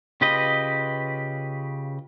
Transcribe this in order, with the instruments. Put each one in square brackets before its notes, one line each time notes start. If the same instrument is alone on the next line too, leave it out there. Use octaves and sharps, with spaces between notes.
[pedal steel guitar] C#3 F4 G4 B4 D#5